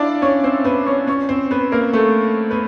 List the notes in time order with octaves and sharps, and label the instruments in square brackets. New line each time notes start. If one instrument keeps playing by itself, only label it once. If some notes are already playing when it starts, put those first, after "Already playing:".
Already playing: [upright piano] D4 E4 F4 D5
C#4 C#5
C4 C5
B3 B4
C#4 C#5
C#4 C#5
C4 C5
B3 B4
A#3 A#4
A3 A4
B3 B4